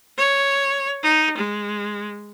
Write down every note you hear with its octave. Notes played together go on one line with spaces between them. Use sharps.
C#5
D#4
G#3